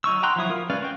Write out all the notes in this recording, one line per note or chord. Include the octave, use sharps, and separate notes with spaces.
F#3 D#4 C#6 E6
F#5 G5 A#5 C6 F#6
F3 F#3 E4 D#6
F4 A#4
G#3 C#4 B4 D5 F5
F#4 G5